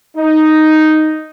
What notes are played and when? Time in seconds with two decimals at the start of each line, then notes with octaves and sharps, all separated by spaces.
0.16 D#4